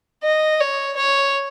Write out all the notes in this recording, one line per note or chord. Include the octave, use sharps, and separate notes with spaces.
D#5
C#5
C#5